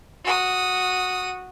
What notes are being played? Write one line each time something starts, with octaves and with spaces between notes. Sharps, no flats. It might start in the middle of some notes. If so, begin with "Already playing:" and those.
F#4 D#6